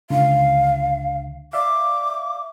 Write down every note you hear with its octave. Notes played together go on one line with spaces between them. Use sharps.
C#2 D3 F5
D5 E5 F5 D6